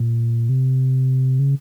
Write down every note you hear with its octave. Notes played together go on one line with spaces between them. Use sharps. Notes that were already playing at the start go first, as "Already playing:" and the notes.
Already playing: A#2
C3
C#3